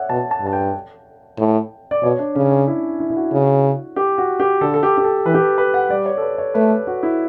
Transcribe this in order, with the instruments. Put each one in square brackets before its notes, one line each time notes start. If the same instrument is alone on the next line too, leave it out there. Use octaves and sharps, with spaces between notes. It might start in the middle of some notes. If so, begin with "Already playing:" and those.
Already playing: [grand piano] C#5 D5 E5 F#5
[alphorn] B2 [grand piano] A5
[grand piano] A5
[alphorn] G2 [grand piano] A5
[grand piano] G5
[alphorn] A2
[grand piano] D5
[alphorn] B2 [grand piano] C#5
[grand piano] D4
[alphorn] C#3 [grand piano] C#4
[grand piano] D4
E4
E4
E4
F#4
[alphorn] C#3
[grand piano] G4
F#4
G4
[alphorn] D3 [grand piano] A4
[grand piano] A4
G4
G4
A4
[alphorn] E3 [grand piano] B4
[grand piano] G4
A4
B4
F#5
[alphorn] G3 [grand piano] D5
[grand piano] C#5
A4
B4
C#5
[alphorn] A3 [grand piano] B4
[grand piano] A4
F#4
E4